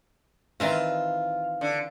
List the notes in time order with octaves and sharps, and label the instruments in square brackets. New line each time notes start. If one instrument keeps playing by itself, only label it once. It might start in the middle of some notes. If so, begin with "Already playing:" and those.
[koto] D#3 E3 C4 [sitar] F4
[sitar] D3